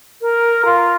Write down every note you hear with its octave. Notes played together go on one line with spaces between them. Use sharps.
A#4
F4